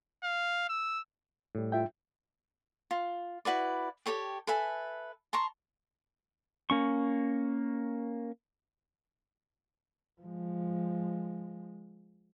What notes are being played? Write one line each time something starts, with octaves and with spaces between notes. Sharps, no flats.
F5
E6
A2 G3
F4 E5 G5
F4
E4 F#4 B4 D5
G4 A4 C#5 G5
A4 B4 E5 G#5
A5 A#5 C6 C#6
A#3 C#4 C#6
F3 G#3